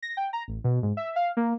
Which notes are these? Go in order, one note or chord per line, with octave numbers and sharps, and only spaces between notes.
A#6
G5
A#5
A1
B2
G#2
E5
F5
A#3